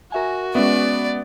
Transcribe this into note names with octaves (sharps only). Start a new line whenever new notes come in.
F#4 A#4 E5 G#5
G#3 B3 C#4 D5 E5